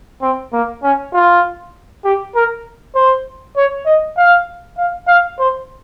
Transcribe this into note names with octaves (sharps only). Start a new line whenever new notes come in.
C4
A#3
C#4
F4
G4
A#4
C5
C#5
D#5
F5
F5
F5
C5